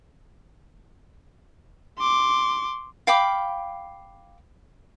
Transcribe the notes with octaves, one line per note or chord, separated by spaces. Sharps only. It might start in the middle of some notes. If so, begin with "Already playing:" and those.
C6 D6
F5 G5 B5 D6